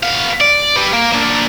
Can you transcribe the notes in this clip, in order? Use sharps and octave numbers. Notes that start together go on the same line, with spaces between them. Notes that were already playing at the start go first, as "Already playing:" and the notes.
B3 F5
D5
G4 B4
A#3
A#3 D4